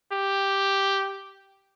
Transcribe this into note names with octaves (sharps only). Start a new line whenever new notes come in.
G4